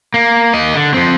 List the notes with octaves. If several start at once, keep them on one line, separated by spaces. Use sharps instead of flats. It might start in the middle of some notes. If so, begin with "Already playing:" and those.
A#3
A#3 D#5
D3
F3 C4